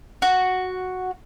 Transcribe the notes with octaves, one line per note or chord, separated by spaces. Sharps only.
F#4